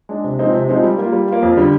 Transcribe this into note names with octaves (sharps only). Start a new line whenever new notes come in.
G#3 D4
C3
F3 G#3 C4 D#4
C3
F3 G#3 C4 D#4
G3
A#3 F4
G3
A#3 F4
F2
D3 G3